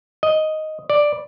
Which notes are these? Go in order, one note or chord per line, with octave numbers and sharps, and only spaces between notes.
D#5
D5